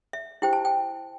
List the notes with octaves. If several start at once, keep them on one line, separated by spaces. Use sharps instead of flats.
E5
E4 G4 C5 G5
A5
G5